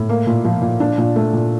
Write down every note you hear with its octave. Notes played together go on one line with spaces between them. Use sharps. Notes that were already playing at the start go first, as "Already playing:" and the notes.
Already playing: A2
A#3
A#2
F3
A#2
D4
A#2
A3
A#2